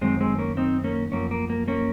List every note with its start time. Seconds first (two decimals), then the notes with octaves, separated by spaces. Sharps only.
0.01 F#2 D#3 F#3 G#3 C4
0.20 G#3 C4
0.38 A#3 C#4
0.57 C4 D#4
0.84 A#3 C#4
1.12 F#2 F3 A#3 C#4
1.31 A#3
1.50 A#3
1.68 A#3 C#4